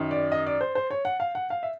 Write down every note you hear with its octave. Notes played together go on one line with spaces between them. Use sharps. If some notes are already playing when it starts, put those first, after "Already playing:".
Already playing: F#2 D#3
D5
D#5
D5
C5
C5
C#5
F#5
F5
F#5
F5
E5